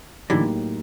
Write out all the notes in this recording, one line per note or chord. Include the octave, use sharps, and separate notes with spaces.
A2 D3 E3 F#3 A#3 D#4 G4